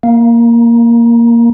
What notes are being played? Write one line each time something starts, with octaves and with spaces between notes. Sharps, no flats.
A#3